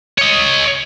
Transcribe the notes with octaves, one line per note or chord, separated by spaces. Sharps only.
C#5 D#5